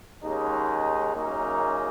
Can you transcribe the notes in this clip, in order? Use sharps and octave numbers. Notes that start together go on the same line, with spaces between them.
D#2 C#3 G#3 D#4
F#2 C#3 A#3 D#4